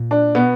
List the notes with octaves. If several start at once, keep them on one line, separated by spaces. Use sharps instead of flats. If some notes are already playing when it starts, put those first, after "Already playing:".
Already playing: A#2
D4
B2 B3